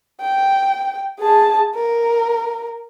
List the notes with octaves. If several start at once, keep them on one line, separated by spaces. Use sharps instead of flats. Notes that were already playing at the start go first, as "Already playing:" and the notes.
G5
G#4 A5
A#4